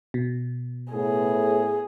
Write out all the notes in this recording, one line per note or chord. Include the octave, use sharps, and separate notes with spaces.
B2
A2 B3 G#4